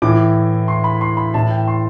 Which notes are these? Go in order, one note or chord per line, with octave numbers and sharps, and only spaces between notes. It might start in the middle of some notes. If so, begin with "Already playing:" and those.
A2 E3 D6
C6
B5
C6
B5
A2 E3 A5
G5
C6